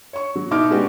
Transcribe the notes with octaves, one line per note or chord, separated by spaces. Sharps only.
C#5 C#6
F#3
B2 D#4 E4 D6 F6
G#3 B3 C#4 D4 F#4 G4